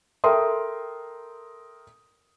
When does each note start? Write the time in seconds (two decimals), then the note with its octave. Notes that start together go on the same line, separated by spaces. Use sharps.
0.24 A4 A#4 E5 G5 C6 D#6